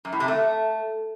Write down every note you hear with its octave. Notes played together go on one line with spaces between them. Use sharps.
F#2
A2
C3
A3